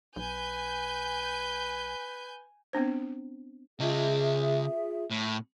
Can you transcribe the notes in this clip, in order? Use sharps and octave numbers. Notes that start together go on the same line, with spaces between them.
B1 B4 G#5 G6
B3 C4 D4 C5
C#3 F4 G#4 D#5 E5
A2